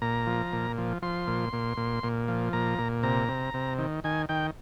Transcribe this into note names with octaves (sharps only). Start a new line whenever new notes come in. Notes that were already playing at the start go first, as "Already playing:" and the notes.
A#2 A#5
F3
A#2
F3
F3 C6
A#2
A#2
A#2
A#2
F3
A#2 A#5
A#2
C3 A#5
C3
C3
D#3
D#3 G#5
D#3 G5